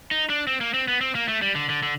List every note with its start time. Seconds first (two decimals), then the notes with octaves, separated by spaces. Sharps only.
0.11 D#4
0.30 D4
0.47 C4
0.61 A#3
0.74 C4
0.88 B3
1.01 C4
1.15 A#3
1.28 A3
1.42 G3
1.55 D3
1.69 D3
1.83 D3